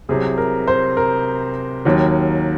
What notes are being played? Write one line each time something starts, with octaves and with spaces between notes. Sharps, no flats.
C2 C3 F#3 G#4
A#4
C5
A#4
D#2 D#3 F#3